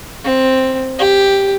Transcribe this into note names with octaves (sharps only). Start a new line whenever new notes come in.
C4
G4